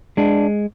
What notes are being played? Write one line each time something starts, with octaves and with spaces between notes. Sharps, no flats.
G#3 D4